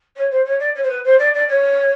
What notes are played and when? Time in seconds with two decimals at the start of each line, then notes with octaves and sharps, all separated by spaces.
0.16 C#5
0.30 C5
0.45 C#5
0.59 D5
0.75 C#5
0.82 C5
0.89 B4
1.04 C5
1.19 D5
1.34 D5
1.48 C#5